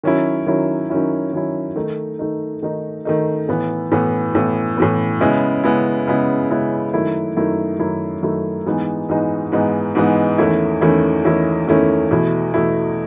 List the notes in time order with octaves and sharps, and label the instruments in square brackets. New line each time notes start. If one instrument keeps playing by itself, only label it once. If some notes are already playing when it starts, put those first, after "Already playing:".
[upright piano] D#3 F#3 C#4 E4
D#3 F#3 C#4 E4
D#3 F#3 C#4 E4
D#3 F#3 C#4 E4
D#3 A3 D#4
D#3 A3 D#4
D#3 A3 D#4
D#3 A3 D#4
A2 E3 B3
A2 E3 B3
A2 E3 B3
A2 E3 B3
C#3 G#3 B3 E4
C#3 G#3 B3 E4
C#3 G#3 B3 E4
C#3 G#3 B3 E4
F#2 D#3 A3 E4
F#2 D#3 A3 E4
F#2 D#3 A3 E4
F#2 D#3 A3 E4
G#2 E3 G#3 B3 D#4
G#2 E3 G#3 B3 D#4
G#2 E3 G#3 B3 D#4
G#2 E3 G#3 B3 D#4
E2 D#3 A3 C#4 E4
E2 D#3 A3 C#4 E4
E2 D#3 A3 C#4 E4
E2 D#3 A3 C#4 E4
E2 B2 A3 E4
E2 B2 A3 E4